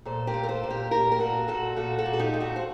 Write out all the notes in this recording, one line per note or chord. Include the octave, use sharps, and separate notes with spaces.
A#2 A4 C5
G4 A#4
A#2
A#4
A4 C5
A#2
G4 A#4
A#2 G4 A#4
A#4
A#2 F#4 A4
A#2 F#4 A4
A#2 F#4 A4
F#4 A4
A#2
A4
D#4 G4
A#2
F#4 A4
C5